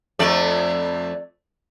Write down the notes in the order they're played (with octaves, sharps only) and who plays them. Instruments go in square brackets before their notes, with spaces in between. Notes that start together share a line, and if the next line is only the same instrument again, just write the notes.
[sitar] F2 A3 D5